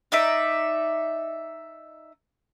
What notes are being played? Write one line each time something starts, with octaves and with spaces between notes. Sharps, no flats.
D#4 D5 E5